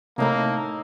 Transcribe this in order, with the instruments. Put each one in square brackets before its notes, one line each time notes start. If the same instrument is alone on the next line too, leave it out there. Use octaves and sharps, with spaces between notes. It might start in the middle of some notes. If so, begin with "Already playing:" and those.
[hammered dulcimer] A2 D#4 E4 [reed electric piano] C3 A3 [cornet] A#3